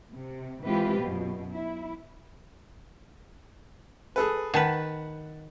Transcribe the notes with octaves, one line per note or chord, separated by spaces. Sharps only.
C3
E3 G#3 C4 F4 G4 B4
F#2 B2
E4
G#4 A4 B4
D#3 B4 F#5 A5